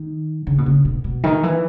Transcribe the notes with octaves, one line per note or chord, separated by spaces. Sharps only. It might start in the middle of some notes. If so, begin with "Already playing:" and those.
Already playing: D#3
C#3
B2
C#3
B2
B2
D#3
E3